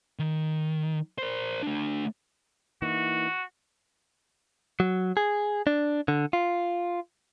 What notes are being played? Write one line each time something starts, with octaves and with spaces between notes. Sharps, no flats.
D#3
A#4 C5
A3 D4
E3 A#3 D#4 F#4
F#3
G#4
D4
D3
F4